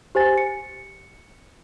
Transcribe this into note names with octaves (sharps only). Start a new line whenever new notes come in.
G4 C5 G#5 A6
C#7